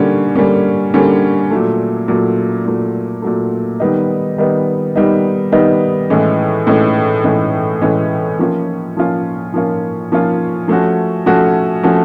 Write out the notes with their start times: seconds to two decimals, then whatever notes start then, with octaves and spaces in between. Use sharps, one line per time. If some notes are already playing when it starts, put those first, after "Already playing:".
Already playing: D3 G3 A#3 C#4
0.35 D3 G3 A#3 C#4
0.94 D3 G3 A#3 C#4
1.51 A#2 F#3 A3
2.08 A#2 F#3 A3
2.65 A#2 F#3 A3
3.22 A#2 F#3 A3
3.80 D#3 G3 B3 D#4
4.38 D#3 G3 B3 D#4
4.96 D#3 G3 B3 D#4
5.52 D#3 G3 B3 D#4
6.10 A2 E3 G#3 C#4
6.67 A2 E3 G#3 C#4
7.24 A2 E3 G#3 C#4
7.82 A2 E3 G#3 C#4
8.39 F3 A#3 C#4 F4
8.97 F3 A#3 C#4 F4
9.54 F3 A#3 C#4 F4
10.12 F3 A#3 C#4 F4
10.68 F3 A3 C#4 F#4
11.26 F3 A3 C#4 F#4
11.83 F3 A3 C#4 F#4